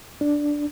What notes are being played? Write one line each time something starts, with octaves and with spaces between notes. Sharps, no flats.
D4